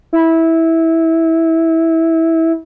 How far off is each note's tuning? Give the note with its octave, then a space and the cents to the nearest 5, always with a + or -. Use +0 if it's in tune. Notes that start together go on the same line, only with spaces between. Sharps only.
E4 -15